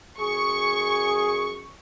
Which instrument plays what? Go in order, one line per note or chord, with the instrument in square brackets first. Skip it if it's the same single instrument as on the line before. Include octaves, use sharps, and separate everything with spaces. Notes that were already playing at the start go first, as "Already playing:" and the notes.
[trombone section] F#2 G#4 [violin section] C#6